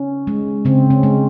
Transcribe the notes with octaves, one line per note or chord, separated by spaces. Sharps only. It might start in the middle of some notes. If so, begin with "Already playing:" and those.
Already playing: C#4
G#3
C#3 C4
C#4
G#3